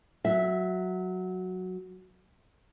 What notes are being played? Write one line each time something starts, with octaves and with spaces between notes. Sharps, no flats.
F#3 E5